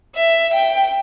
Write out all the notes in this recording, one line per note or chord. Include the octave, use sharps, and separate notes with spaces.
E5
G5